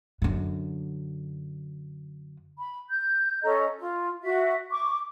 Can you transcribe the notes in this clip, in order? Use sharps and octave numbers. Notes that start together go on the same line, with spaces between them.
F#2 D3
B5
G6
C#4 A4 D#5 A#5
F4
F#4 E5
C#6 D6